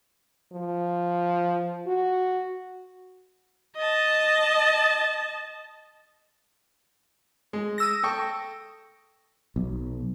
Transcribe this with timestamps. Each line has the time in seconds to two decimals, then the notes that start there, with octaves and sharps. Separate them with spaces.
0.53 F3
1.87 F#4
3.77 D#5 A5
7.53 G#3
7.78 D#6 E6 A#6
8.03 A4 G5 C#6
9.56 B1